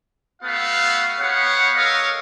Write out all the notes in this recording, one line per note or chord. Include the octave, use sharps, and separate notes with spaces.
A3 B3 F#4 F5
B3 G4 C#5 F5 F#5
A4 A#4 C#5 D#5 F5